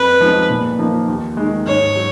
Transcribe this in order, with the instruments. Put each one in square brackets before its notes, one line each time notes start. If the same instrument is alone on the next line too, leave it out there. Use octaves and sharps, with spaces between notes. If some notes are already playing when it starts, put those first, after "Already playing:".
Already playing: [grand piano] F2 [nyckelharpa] B4
[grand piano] F3 G#3 D#4
A#2
F3 A#3 D#4
D#2
D#3 G#3
[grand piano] G#2 [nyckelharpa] C#5
[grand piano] F#3